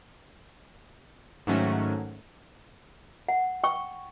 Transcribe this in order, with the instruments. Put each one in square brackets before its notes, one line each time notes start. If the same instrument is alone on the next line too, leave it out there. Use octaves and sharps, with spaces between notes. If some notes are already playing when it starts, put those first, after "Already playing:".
[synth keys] G#2 D#3 F#3 A3 C#4 F#4
[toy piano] F#5
G5 C#6